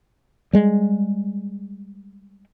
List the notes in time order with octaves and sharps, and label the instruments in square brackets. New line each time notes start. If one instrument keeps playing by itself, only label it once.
[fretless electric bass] G3 G#3